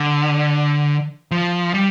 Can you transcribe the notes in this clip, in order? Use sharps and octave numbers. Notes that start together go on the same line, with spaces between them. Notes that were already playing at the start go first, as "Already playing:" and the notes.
Already playing: D3
F3
G3